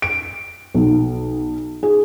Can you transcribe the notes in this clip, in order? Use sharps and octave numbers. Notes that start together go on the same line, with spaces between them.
D7
B1
G#4